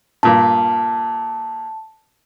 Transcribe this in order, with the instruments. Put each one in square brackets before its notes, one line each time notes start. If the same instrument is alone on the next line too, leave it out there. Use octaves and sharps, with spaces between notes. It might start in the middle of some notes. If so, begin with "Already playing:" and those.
[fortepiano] G2 A#2 [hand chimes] A5